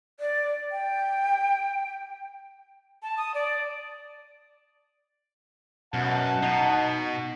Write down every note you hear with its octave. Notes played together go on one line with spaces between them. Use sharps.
D5
G5
A5
D#6
D5
F#2 B2 F#5 A5
B2 D#4